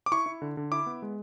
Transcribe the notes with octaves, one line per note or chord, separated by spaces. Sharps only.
D6
E4 C#6
E4
D3
D3
E4 D6
B3
G#3